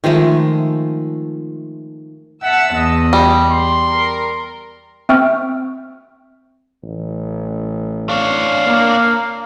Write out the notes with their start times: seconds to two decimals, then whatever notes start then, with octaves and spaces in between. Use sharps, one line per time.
0.04 D#3 F3 G#3 A3
2.43 E5 F#5 A5 E6
2.75 E2 D#5
3.13 G3
3.51 C6
3.93 A#4
5.09 C4 E5 G5 C#6 F6
6.83 A1
8.09 D4 C#5 F5
8.66 A#3